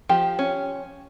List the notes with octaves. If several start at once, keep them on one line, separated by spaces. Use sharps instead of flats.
F3 G4
C#4